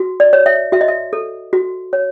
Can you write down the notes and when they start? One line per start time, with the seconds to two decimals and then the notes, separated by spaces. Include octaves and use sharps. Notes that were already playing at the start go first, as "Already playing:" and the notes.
Already playing: F#4
0.20 D5
0.33 C#5
0.46 E5
0.72 F#4 E5
0.81 D#5
0.88 E5
1.13 A4
1.53 F#4
1.93 C#5